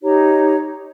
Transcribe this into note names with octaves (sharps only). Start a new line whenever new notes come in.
D#4 G4 C#5 A#5